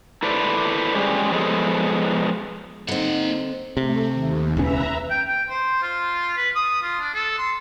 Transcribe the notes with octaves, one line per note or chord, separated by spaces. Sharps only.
E4 A4 B4 C5 D5
G3 G#3 C#4 G4 G#4
F3 G#3 B3 G#4 A4
D3 A#3 C4 D#4 F#5
C3 A3
D#2
E1 C#2 C#4 B4 E5 A#5
G5
G5
C5
F4
B4
D#6
F4
D4
A4
C6